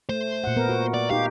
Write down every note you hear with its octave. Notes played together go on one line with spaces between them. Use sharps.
A3 C5
A#2 F#5
B3 A#4
F#4
D5
D#4 G4 F5